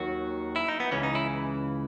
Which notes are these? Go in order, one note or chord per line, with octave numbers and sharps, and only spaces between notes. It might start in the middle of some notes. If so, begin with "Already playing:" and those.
Already playing: D#2 D#3 F#3 F#4
E4
D#4
B3
C#2 C#3 E3 C#4
D#4
E4